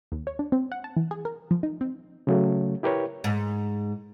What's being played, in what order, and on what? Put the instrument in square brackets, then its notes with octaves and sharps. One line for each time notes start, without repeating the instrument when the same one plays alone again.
[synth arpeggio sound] D#2
C#5
D4
C4
F#5
A5
E3
G#4
A#4
F3
D#4
C4
[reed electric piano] C#3 F#3 A3
E4 G4 A#4 B4 C#5
[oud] G#2